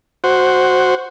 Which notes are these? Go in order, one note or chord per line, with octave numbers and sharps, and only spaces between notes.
F#4 C5